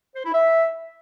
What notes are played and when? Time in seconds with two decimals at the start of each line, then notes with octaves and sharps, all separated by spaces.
0.16 C5
0.25 E4
0.34 E5